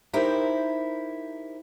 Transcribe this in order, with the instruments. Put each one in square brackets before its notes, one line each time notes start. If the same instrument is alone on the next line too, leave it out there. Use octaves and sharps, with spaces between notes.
[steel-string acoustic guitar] D#4 E4 G4 A#4 C5